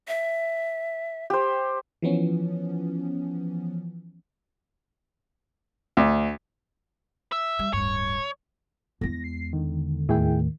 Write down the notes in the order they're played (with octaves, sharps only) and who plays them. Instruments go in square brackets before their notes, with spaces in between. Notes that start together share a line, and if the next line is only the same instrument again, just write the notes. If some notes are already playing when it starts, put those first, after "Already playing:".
[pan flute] E5
[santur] G4 C5
[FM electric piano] E3 F3 B3 C#4
[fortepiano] D2
[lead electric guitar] E5
[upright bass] G3
[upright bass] D1 G2 [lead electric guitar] C#5
[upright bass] E2 G#3 [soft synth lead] A#6
[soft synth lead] C7
[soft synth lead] D3 [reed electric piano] D#3
[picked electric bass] D#2 A2 A3 [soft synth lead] D#3 [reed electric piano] E4 G#4 G5